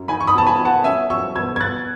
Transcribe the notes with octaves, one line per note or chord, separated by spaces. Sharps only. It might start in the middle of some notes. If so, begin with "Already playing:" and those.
Already playing: F#2
D#4 G#5 B5
C#6
B5 D#6
B2 A5
G#5 B5
B2
F#5 A5
C#4 E5 G#5
F#3 C#6 E6
B2 E6 G#6
G#6
B2 F#6 A6